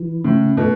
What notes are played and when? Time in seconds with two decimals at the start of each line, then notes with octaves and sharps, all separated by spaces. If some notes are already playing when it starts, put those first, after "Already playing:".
Already playing: E3
0.24 A2 C#3
0.57 B2 A3